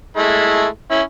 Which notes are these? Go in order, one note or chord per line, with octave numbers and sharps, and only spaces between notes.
G#3 A3 E4
C#4 E4